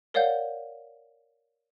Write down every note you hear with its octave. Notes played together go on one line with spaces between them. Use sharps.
A#4 C#5 D5 F5 F#5 G6